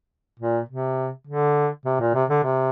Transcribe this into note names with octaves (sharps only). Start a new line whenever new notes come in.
A#2
C3
D3
C3
A#2
C3
D3
C3